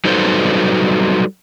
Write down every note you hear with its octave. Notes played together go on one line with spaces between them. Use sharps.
F#3 G3 D#4 A4 B4 C5